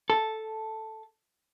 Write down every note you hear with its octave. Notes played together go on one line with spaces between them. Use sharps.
A4